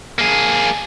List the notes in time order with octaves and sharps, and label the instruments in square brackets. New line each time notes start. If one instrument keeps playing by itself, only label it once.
[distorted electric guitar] A#3 G#4